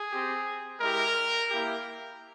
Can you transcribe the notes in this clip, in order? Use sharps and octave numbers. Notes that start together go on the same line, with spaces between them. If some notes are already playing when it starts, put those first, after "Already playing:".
Already playing: G#4
C4 G4
G#3 E4 G4 A#4
A#3 E4 G4